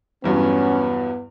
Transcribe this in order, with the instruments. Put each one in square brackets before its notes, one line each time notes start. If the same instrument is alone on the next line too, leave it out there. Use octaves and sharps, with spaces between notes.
[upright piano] E2 G2 F#3 [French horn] B3 [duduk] C#4